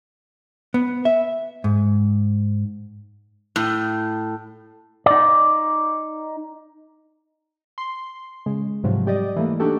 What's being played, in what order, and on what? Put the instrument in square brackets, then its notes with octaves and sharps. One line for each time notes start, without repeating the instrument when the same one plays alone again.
[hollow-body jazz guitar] B3
E5
G#2
[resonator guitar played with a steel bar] A2
[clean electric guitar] D#4 D5
[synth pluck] C6
C#3 G#3
G#2 C3 F3 F#3
G3 G4 D5 D#5
E3 A3 A#3
D4 D#4 F#4 G4 A4